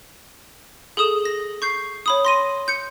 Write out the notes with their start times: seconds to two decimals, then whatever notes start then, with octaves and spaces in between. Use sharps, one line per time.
0.97 G#4 A4 D#6 E7
1.25 A#6
1.62 C#6 G6 C7
2.06 C#5 B5 D#6
2.25 C6 A#6 D#7
2.68 G6 C#7